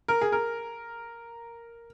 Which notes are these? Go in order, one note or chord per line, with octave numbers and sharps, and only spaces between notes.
A#4
G#4
A#4